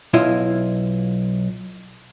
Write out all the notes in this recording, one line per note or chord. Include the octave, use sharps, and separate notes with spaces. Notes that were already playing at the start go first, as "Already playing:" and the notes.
B1 E4 F4 D#5